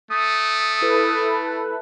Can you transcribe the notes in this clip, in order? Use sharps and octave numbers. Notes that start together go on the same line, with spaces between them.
A3 D#6
E4 A4 B4